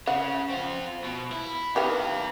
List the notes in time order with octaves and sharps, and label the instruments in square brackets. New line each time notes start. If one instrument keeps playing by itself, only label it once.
[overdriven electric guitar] C#3 [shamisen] F#5
[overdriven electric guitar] C4 F4
B2
E4
[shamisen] D#3 B3 G4 [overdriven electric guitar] A4 F5